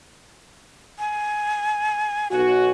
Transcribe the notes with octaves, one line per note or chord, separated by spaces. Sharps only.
G#5
B1 F#4 G#5